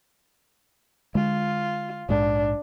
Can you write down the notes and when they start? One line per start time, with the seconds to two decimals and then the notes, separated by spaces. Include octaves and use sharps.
1.15 D3 G#3 F4
2.09 A#1 G#2 D4